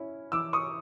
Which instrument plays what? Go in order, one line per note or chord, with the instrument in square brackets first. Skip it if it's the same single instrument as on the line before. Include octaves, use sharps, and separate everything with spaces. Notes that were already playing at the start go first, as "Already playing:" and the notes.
Already playing: [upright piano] C#4 E4
E3 D6 E6
C#6 D#6